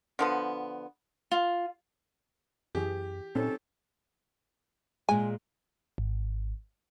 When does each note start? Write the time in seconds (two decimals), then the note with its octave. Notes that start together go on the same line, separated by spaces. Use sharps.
0.19 D3 F3 B3
1.31 F4
2.75 F#2 E3 G4 G#4
3.35 A#2 C4 C#4 D#4 A4
5.09 A#2 G#3 G#5
5.98 G#1